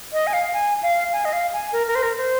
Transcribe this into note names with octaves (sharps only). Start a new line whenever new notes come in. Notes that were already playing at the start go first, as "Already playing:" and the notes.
D#5
G#5
F5
G#5
F5
G#5
D#5
F5
G#5
A#4
A#4
C5
A#4
C5